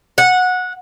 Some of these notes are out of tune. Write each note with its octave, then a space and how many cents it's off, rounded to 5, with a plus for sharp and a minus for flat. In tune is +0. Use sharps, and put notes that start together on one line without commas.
F#5 -15